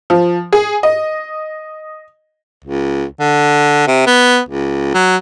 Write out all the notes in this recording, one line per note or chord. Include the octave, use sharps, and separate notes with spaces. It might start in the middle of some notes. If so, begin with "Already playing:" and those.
F3
G#4
D#5
C#2
D3
C3
B3
C#2
F#3